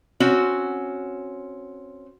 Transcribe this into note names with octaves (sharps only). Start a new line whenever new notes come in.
C4 C#4 F#4